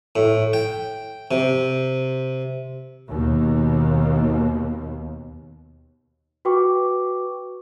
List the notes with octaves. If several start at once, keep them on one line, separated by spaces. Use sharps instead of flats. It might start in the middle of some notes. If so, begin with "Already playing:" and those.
A2
G5
C3
D#2 B2
F#4 B4 G5 C#6 D6